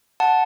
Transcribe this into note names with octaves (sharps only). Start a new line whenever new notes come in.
F#5 A5